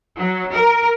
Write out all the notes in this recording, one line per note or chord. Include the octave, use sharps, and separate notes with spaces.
F#3
A#4